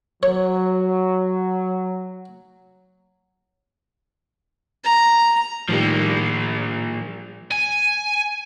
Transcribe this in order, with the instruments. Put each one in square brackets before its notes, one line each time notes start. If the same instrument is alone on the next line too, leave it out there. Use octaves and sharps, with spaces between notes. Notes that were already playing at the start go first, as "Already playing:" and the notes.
[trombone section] F#3 [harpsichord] C#5
[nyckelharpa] A#5
[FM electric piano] A2 D#3 G3 [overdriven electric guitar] F3 A#3
[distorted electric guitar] G#5